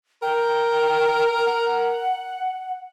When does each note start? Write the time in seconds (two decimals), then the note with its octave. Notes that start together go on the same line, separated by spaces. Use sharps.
0.22 A#4 G5
1.46 F#5